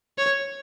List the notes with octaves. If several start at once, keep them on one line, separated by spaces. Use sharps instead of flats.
C#5